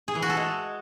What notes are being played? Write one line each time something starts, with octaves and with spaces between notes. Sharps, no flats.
G#4
E3
F#4
A4
G#3